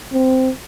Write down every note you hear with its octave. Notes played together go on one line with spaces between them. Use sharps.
C4